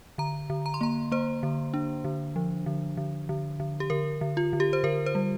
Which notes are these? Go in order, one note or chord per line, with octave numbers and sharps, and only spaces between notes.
D3 A#5
D3
A#5
C6
A#3 A#5
A#3 C5
D3
D4
D3
F3
D3
D3
D3
D3
G4
D3 A#4
D3
F4
D3
G4
C5
D3 A#4
C5
G3